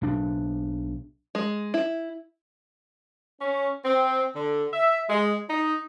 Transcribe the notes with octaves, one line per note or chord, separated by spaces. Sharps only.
B1 D4
G#3
E4
C#4
C4
D3
E5
G#3
D#4